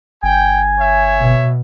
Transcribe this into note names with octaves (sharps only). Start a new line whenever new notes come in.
G1 G5 G#5
C#5 E5
B2